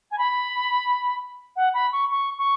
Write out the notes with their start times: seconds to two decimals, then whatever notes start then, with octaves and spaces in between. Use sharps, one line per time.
0.11 G#5
0.18 B5
1.56 F#5
1.74 B5
1.92 C#6
2.10 C#6
2.38 C#6